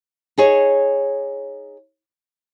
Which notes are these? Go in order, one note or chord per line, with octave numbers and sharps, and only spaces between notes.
D#4 G#4 C#5